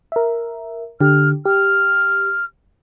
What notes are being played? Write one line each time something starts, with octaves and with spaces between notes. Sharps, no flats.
A#4 E5
D3 G4 F6
G4 F6